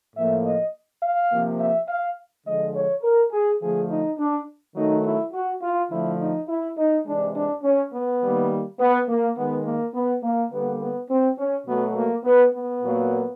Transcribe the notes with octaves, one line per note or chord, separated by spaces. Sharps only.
A2 F3 A#3 E5
D#5
F5
C3 F3 A#3
E5
F5
D3 F3 G#3 D#5
C#5
A#4
G#4
D3 F3 A3 G#4
D#4
D4
D#3 F#3 A3 D#4
E4
F#4
F4
D3 F3 A3 E4
D#4
E4
D#4
C3 E3 G#3 D4
D4
C#4
B3
D#3 G3 A#3
B3
A#3
D#3 G#3 B3
A#3
B3
A#3
D3 G3 A#3 B3
B3
C4
C#4
B2 F#3 A3 B3
A#3
B3
B3
A#2 F#3 A#3